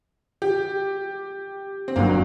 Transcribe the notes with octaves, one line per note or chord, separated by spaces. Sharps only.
G4
C4
G1 G2 F#3 A#3